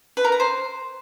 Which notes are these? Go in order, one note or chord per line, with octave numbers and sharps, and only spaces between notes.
B4
A#4
A#5
C5